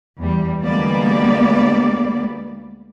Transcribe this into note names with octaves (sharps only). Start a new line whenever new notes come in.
E2 G3
D2 G3 G#3 A#3 B3 D5